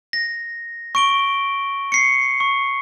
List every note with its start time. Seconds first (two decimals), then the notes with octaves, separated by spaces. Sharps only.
0.13 A#6
0.95 C#6 D7 G7
1.92 C7 C#7
2.40 C#6